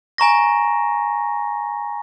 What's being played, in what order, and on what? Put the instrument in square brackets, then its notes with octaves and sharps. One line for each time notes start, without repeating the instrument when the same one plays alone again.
[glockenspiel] G#5 A#5 C#6 A#6